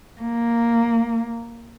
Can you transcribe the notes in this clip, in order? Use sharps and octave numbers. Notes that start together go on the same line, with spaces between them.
A#3